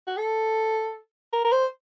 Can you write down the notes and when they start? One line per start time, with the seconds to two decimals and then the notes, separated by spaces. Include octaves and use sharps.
0.07 F#4
0.17 A4
1.33 A#4
1.45 A#4
1.52 C5